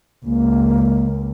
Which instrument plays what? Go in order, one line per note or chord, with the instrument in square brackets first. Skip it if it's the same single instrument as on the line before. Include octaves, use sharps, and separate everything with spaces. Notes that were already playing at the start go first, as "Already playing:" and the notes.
[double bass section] C#2 [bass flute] A#3